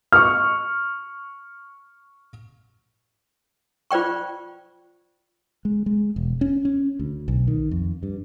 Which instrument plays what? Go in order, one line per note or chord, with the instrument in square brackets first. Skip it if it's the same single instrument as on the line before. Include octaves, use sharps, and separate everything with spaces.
[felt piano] C#6 F6
[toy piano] F4 C5 D5 G5 C#6
[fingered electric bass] G#3
G#3
E1
C#4
C#4
D2
B1
D#3
F2
G2